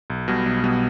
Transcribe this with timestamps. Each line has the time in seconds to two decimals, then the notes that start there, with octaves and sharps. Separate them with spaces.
0.10 B1
0.28 B2 G3 B3
0.46 B1
0.64 B2 G3 B3